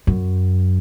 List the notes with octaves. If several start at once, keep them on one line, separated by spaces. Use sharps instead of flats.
F#2